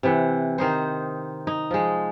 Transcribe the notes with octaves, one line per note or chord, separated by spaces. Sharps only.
C3 E3 F#5
D#3 D#4 C5
D#4
F3 G#3